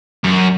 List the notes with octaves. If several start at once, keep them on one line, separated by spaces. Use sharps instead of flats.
F#2